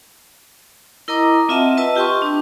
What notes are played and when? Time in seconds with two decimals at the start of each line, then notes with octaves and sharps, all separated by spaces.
1.08 E4 A#4 D#5 A#5 D6 D#6
1.49 C4 F4 D#5 E5 F#5 A5
1.77 B4 D#5 A5 E6
1.96 F4 G4 G5 A5 C6 C#6
2.22 D4